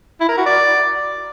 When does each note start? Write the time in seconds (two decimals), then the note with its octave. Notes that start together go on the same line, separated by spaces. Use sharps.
0.20 E4
0.29 A#4
0.37 F#4
0.46 D5